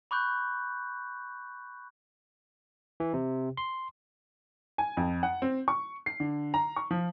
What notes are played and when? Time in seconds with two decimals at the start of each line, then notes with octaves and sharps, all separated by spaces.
0.11 B5 C#6 D6 F#6 G6
3.00 E3
3.14 C3
3.57 C6
4.78 G#5
4.97 F2
5.23 F#5
5.42 C4
5.68 C#6
6.06 C7
6.20 D3
6.54 A#5
6.76 C#6
6.91 F3